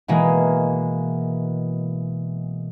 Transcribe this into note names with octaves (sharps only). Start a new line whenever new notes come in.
B2 E3 G#3 A#3